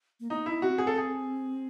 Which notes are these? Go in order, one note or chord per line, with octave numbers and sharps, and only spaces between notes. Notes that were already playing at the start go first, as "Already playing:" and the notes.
A#3
B3 D#4
E4
C4 F#4
G#4
A4
G#4